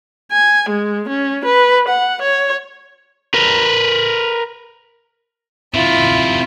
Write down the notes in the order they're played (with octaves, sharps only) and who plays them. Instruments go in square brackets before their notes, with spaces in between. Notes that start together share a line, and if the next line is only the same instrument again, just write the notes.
[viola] G#5
G#3
C#4
B4
F#5
C#5
[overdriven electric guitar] A#4 B4
[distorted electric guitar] C3 D#3 [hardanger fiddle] E4 F4